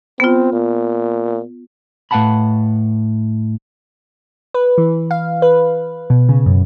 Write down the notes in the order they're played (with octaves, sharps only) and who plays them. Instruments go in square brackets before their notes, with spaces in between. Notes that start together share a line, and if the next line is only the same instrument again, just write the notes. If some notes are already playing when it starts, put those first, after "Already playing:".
[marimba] B3 F4 [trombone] C4
[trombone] A#2
[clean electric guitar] A2 B4 F5 F#5 A5 B5
[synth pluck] B4
E3
F5
B4
B2
C#3
F#2